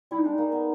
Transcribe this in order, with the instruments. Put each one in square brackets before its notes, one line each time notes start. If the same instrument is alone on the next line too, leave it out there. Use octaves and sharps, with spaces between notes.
[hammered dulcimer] G3 [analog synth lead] E4
[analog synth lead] D#4
[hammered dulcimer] G#3 [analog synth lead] D4
[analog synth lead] D#4
[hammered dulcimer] A#3
B3